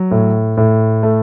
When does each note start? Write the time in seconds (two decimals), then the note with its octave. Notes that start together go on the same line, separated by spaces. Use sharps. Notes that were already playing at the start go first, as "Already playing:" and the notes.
Already playing: F#3
0.11 A2
0.57 A2
1.03 A3